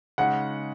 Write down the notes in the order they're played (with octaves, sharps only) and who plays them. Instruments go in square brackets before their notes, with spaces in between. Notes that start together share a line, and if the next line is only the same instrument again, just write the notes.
[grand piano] C#3 G#3 D#4 [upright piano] F#5